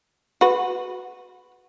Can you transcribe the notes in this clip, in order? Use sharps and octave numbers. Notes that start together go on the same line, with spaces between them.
F#4 B4